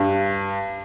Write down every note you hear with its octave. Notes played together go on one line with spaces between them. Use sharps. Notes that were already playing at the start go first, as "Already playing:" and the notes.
Already playing: G2